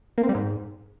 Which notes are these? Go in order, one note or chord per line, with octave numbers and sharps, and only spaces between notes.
A#3
C4
G3
G#2